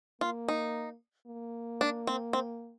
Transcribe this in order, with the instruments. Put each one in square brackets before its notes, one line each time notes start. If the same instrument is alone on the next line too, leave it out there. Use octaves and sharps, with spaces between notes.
[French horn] A#3 [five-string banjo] F4
[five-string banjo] D#4
[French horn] A#3
[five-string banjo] D4
C4
C4